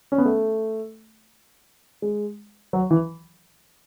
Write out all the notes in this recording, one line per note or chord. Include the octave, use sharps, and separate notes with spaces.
C#4
B3
A3
G#3
F#3
E3